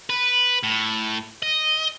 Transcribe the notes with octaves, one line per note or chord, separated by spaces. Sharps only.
B4
A2
D#5